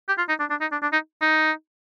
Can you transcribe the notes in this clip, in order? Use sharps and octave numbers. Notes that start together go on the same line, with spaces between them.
G4
F4
D#4
D4
D4
D#4
D4
D4
D#4
D#4